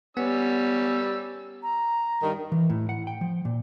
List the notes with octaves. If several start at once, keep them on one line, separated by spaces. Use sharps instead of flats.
G3 B3 C#4 E6
A#5
G2 D#3
E3
A2
F#5
G5
F3
A#2